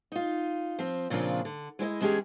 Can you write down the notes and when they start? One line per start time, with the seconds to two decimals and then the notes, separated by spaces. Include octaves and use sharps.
0.12 D#4 F4
0.79 F3 C4
1.10 A#2 C#3 F3 C4 D4 F4
1.45 D3
1.79 G#3 E4 D5 D#5
2.01 E2 G#3 C#4 D4 G4 G#4